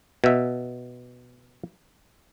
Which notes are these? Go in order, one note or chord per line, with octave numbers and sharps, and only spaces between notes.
B2 E5